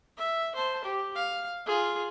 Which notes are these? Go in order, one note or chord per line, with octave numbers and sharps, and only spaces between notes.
E5
C5 A5
G4
F5
F4 G#4